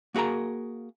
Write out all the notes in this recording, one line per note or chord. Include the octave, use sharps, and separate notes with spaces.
A#3 F#4 G#4 A#4 A#5